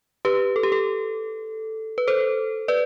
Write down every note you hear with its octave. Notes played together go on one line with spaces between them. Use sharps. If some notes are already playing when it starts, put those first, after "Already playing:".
G4 B4
A4
G4
A4
B4
A4 C5
B4 D5